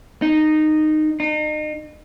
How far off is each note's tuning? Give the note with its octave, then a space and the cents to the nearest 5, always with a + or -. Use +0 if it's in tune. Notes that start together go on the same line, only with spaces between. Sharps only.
D#4 -15
D#4 -35